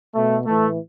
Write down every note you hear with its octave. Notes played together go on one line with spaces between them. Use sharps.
B2 A3
A2 E3 A3